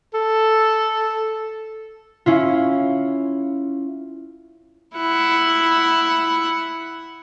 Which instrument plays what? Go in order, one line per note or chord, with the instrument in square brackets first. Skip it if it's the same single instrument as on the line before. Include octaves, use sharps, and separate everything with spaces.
[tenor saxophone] A4
[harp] C#4 E4 F4
[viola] E4 F#5